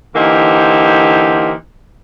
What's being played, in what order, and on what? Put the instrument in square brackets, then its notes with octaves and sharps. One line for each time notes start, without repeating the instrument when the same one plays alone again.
[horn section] D3 E3 A#3 D#4 G4 C5